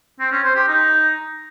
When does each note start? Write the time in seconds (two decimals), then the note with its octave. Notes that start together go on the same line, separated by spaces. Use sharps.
0.20 C4
0.32 C#4
0.44 C5
0.56 G4
0.68 D#4